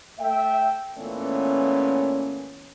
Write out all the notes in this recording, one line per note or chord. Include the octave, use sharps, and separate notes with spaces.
A3 E5 G5
A#2 E3 A3 B3 C#4